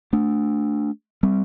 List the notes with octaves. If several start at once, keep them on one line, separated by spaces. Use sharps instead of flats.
A3 D4
G3 C4